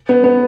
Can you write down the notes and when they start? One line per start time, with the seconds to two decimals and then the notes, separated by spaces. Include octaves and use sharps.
0.09 B3
0.24 B3